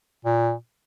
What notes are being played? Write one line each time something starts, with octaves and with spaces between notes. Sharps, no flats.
A#2